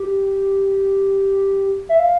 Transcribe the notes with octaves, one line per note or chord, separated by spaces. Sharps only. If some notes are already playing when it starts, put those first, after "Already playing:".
Already playing: G4
E5
F5